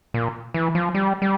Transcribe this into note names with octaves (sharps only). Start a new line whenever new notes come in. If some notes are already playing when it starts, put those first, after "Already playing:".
A#2
E3
F3
G3
G3